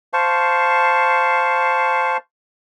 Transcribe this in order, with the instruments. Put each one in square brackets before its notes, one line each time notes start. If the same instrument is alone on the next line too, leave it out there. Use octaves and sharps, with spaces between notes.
[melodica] C5 F5 A5 C#6